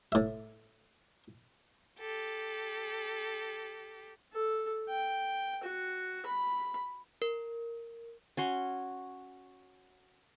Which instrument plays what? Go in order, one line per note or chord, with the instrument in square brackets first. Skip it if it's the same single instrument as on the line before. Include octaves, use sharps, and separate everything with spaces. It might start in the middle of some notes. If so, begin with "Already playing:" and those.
[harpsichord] A2 E5
[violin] G4 A4
[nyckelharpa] A4
G5
F#4
B5
[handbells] A#4
[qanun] C#4 F#4 C6